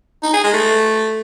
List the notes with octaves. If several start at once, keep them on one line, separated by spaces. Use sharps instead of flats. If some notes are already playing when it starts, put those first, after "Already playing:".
D#4
G#4
G#3
A3